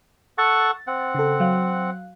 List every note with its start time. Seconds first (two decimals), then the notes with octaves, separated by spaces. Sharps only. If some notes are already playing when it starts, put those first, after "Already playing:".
0.38 A4 F#5 C#6 A6
0.87 C4 F#5
1.15 C#3 A4
1.40 F#3 F5 F#6